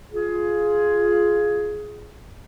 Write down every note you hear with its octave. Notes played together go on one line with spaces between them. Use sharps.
F4 G#4